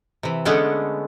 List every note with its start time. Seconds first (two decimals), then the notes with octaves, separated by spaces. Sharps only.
0.23 C3 E3
0.45 D3 G#3 A3 B3 C#4 D4